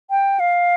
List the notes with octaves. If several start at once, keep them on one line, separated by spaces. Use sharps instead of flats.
G5
F5